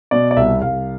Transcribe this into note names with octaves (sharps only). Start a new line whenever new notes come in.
B2 D5
D5
C2 E5
C2 F5